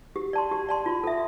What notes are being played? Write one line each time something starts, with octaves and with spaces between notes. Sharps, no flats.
G4
D5 A5 C6
G4
D5 A5 C6
F4
A4 E5